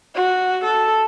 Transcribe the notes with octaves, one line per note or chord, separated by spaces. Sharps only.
F#4
A4